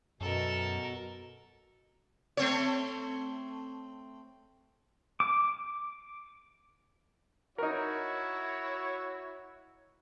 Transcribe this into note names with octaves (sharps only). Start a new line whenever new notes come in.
F#2 B2 A4 A#4
A3 C4 C#5
D6
D#4 E4 F#4 A#4 C#5